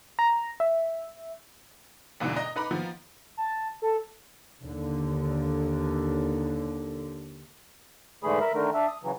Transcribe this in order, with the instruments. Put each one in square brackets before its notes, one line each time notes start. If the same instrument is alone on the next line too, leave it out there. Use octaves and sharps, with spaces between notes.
[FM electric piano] A#5
E5
[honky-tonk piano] E2 G#2 B2 D3 E3
D#5 A#5
D#4 B4 A#5 B5 D6
D#3 F3 B3
[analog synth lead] A5
A4
[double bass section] D#2 D3
[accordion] G#2 D3 E3 A3 G#4 B5
A#4 E5 B5
D3 D#3 A3 A#4
D4 E5
D#6
C#3 E3 F#3